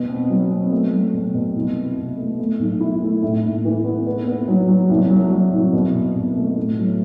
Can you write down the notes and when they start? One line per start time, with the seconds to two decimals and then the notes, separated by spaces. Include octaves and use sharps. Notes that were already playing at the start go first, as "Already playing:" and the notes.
Already playing: B2
0.09 C4
0.29 F#3
0.51 C4
0.72 A3
0.93 F#3
1.13 B2
1.34 B2
1.55 C2
1.77 C3
1.97 C3
2.17 A3
2.39 A3
2.59 B1
2.80 E4
3.02 A3
3.22 A2
3.44 A2
3.65 E3
3.85 B3
4.06 B3
4.27 B3
4.48 F#3
4.68 F#3
4.90 C2
5.10 F#3
5.31 F#3
5.53 C2
5.73 B2
5.94 B2
6.16 B2
6.37 A3
6.57 A2
6.78 F#3